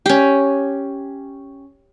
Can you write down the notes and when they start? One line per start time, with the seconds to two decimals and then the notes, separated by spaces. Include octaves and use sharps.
0.06 C#4 G4